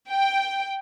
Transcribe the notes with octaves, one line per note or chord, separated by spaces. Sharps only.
G5